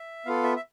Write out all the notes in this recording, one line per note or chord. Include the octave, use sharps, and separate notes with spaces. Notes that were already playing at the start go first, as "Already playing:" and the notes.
Already playing: E5
B3 F4 A4 F5
E5
E5